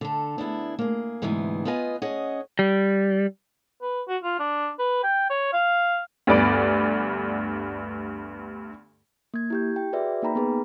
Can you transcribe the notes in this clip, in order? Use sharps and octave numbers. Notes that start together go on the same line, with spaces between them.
D3 A4
B3 D4 E4 G#4
A#3 G#4
D2 G#2 C3 E3 B3 G#4
B3 F4 B4 D#5 G#5
C#4 G#4 D#5 F#5
G3
B4
F#4
F4
D4
B4
G5
C#5
F5
D2 G2 B3 D5 B5 D7
A#3 G#6
E4 G4 G6
G5
F#4 G#4 B4 D5 E5
A#3 D#4 G5 A#5 B5
B3 G#4 B4